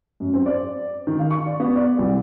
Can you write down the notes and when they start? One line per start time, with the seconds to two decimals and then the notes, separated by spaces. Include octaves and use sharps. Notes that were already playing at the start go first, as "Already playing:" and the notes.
0.20 F#2
0.34 C4
0.46 D5
1.07 D#3
1.19 F5
1.31 C#6
1.46 D5
1.60 B3
1.76 D5
1.99 C2